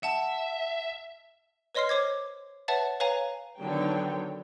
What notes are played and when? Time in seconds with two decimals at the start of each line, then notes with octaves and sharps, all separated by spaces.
0.03 E5 F#5 A5
1.75 B4 C#5 D#5 C6 F6 C7
1.89 C5 C#5 D6 G#6
2.68 B4 C#5 E5 F#5 A5 A6
3.00 B4 C#5 F5 G#5 A#5
3.58 D3 D#3 F#3 B3 C#5 G5